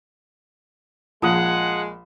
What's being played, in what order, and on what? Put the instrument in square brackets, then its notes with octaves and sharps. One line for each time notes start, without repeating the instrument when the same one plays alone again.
[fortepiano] A#1 D#6 [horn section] G#3 [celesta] F4 F5 A5 [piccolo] F#5